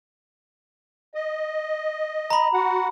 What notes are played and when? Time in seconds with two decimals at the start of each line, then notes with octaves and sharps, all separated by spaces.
1.14 D#5
2.30 A#5 B5
2.53 F#4 F#5